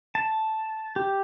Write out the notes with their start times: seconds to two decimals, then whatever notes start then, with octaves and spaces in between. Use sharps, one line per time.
0.15 A5
0.96 G4